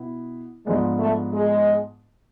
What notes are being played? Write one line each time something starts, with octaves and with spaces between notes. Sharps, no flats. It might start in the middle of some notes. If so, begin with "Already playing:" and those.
Already playing: B2 B3 E4
G#2 F3 G#3 B3 D4
A3
G#3